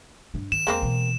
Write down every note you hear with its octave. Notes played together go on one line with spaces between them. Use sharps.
G2 D4
D#3 E7
E2 G#3 A#3 C4
B2 E3